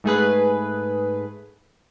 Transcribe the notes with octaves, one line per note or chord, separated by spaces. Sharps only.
G#2 A3 G#4 B4